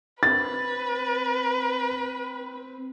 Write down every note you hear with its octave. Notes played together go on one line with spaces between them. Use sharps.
C4 B4 A6